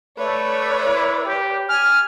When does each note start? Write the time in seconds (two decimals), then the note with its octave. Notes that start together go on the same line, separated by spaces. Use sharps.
0.18 A3 B4 C#5 D5
0.85 E4
1.25 G4
1.69 G#5 F6